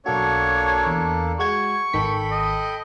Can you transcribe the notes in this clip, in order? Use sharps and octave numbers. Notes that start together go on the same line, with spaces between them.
B1 A#3 D4 F#4 A4 C#5
E2
G#3 F#4 C#6 G#6
G#1 D#3 A4 G5 B5 B6
D#5